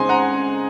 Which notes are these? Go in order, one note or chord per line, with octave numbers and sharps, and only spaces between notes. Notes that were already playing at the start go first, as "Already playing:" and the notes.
Already playing: C#3 G#3 C4 D#4 G#5 C6
F#5 A#5